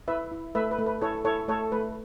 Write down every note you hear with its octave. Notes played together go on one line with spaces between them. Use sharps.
E4 B4 E5
E4
A3 B4 E5
B4
A3
B4
E4 A4 C#5
E4 A4 C#5
A3 A4 C#5
A3 B4